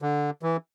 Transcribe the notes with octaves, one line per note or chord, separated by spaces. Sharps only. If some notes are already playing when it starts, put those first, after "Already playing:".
D3
E3